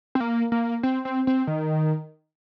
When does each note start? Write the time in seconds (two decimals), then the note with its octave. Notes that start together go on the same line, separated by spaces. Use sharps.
0.15 C4
0.20 A#3
0.52 A#3
0.83 C4
1.05 C4
1.27 C4
1.47 D#3